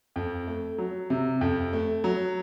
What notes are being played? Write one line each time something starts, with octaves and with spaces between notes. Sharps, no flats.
F2
A3
F#3
C3
F2
A3
F#3